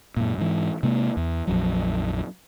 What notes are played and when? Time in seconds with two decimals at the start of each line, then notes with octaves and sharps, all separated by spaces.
0.17 F#2 A#2
0.38 G#2 E3
0.83 C3 G#3 A#3
1.17 E2
1.47 A#1 F2 F#3